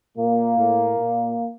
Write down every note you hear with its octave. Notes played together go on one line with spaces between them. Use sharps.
A#2 A#3
A2
A#2